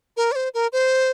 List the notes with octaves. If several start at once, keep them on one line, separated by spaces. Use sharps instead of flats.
A#4
D5
C5
A#4
C5